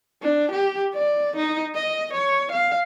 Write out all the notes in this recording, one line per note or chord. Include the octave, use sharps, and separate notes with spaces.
D4
G4
D5
D#4
D#5
C#5
F5